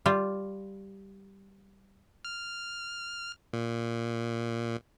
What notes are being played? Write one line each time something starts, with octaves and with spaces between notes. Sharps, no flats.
G3 F4
F6
A#2